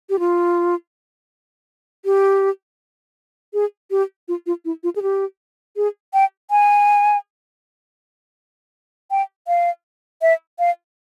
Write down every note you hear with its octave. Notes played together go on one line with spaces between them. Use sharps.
G4
F4
G4
G#4
G4
F4
F4
E4
F4
G#4
G4
G#4
G5
G#5
G5
F5
E5
F5